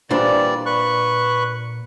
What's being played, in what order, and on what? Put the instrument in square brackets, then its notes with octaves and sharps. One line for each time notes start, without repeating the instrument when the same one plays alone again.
[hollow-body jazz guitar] A#2 D4 C5 [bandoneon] E3 G3 D5
[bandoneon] B4 C#6 F#6